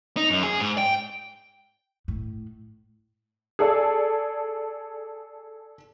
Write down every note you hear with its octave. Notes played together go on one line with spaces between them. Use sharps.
D#4
F#2
G#4
G#2
G5
A2
G#4 A4 D5